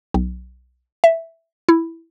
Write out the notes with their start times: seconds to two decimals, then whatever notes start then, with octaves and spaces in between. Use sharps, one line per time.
0.14 B1
1.04 E5
1.69 E4